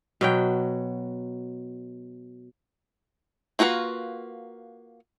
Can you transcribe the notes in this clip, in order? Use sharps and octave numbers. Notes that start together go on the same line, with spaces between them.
B2 F#3 G5
A#3 F4 F#4 A4 B4